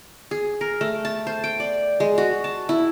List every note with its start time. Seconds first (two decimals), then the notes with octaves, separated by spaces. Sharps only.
0.31 G#4
0.61 A#4
0.81 A3
1.05 A5
1.27 C5
1.44 G5
1.60 D5
2.00 G#3
2.18 F#4
2.44 A5
2.69 E4